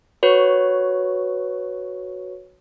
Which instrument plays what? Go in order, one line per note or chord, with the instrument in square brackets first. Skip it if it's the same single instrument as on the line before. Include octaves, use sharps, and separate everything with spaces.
[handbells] F#4 B4 C#5